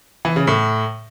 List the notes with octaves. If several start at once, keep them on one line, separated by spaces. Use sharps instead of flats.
E3
C#3
A2